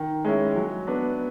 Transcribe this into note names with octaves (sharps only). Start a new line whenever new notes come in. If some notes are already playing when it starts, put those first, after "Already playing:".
Already playing: D#3
G#3 C#4 E4
F#3
B3 D4